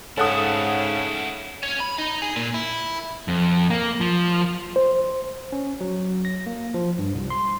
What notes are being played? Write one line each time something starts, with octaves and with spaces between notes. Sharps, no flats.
G#2 C#3 C#4 E4 A4 F#5 D#6
C#4
B5
D#4
G#4
A#2
E4
F2
A#3
F3
C5
C#4
F#3
A#6
A#3
F3
G2
C2
C6